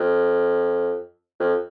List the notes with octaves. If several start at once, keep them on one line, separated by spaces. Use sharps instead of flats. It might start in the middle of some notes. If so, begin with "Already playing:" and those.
Already playing: F2
F2